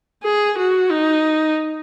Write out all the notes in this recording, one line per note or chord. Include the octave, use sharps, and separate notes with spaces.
G#4
F#4
D#4